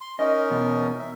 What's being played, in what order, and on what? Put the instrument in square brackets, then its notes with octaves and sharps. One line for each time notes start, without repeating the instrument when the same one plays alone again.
[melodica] C6
[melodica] C#4 D#4 A#4 [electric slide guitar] D#5
[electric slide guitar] E2 B2
[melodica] E5